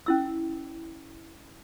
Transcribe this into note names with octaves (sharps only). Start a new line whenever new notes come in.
C#4 E4 E6